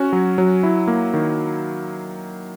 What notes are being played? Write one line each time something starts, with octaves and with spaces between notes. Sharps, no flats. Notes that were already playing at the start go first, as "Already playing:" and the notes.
Already playing: C#4 F#4
F#3
F#3
E4
A#3
D#3